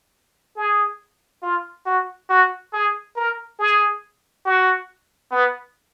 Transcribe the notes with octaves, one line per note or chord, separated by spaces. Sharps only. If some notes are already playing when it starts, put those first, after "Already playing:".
G#4
F4
F#4
F#4
G#4
A#4
G#4
F#4
B3